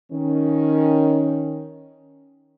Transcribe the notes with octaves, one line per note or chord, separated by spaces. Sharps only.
D#3 C#4